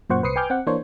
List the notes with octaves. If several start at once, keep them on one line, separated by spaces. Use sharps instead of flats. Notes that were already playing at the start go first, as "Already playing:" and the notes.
F#2 A#2 C5 F#5 C#6
C2 B4 C5 D#6 C7 C#7
B4 G5 G#5 D6 F6 G6
C4 F#5
E3 A#3 D4 C5 C#5